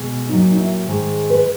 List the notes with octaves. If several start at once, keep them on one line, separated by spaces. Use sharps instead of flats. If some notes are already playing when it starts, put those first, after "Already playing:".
Already playing: B2 G#3
A#2 F#3 D#4
D#4
E4
G#2 D#3 G#3
B4